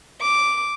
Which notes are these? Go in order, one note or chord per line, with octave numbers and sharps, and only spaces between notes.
D6